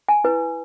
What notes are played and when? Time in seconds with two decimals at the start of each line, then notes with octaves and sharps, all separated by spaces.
0.09 G#5
0.24 E4 B4